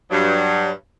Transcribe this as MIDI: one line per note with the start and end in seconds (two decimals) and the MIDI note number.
0.10 0.69 43
0.10 0.69 54